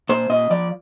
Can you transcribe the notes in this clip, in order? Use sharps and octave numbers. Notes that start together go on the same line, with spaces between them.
A#2 C5
A#2 D#5
F3 D5